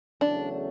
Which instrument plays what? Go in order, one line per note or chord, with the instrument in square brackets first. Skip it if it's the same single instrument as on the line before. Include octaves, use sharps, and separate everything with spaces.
[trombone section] E2 C#3 F#3 A3 C#4 [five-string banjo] D4